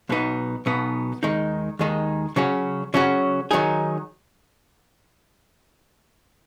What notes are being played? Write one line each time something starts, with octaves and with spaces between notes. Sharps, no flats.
B1 B2 B3 D#4
B1 B2 B3 D#4
D#2 D#3 G#3 D#4
D#2 D#3 G#3 D#4
C#3 F#3 C#4 F#4
C#3 F#3 C#4 F#4
D#3 F#3 D#4 G#4